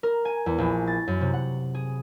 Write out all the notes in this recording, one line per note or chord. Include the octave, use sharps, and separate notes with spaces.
A#4
G#5
E2
A#1
A6
F#2
C3
F#5
G#4